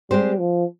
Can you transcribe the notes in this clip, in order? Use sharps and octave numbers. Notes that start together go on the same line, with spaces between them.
G3 G#3 C4 G4 C5
F3